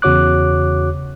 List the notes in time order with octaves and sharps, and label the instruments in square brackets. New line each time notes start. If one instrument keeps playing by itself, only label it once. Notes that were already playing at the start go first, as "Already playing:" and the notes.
[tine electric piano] E2 C#3 F#4 C#5 D6 F#6